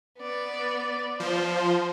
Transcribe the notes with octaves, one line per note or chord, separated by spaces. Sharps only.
B3 D5
F3 C5